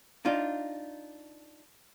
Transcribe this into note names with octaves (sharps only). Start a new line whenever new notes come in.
D4 D#4 F4